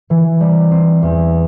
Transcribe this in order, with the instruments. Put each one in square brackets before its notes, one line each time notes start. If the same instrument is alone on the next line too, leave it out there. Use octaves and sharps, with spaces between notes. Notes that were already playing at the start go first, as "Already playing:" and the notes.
[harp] E3
G3
C4
E2